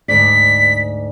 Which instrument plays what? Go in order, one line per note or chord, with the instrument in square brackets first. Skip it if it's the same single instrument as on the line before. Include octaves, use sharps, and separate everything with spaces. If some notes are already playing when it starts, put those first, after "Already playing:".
[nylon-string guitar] D2 G#2 D5 [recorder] B6